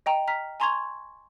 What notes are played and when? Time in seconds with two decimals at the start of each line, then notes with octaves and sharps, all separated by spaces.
0.06 D#5 G5 A#5
0.28 A#5 F6 B6
0.60 G#5 A#5 C6 C#6 G#6 F7